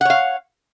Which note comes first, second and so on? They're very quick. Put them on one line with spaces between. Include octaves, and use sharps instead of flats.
F#5 C#5 F5